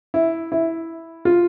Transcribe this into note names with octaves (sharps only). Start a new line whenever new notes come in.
E4
E4
F4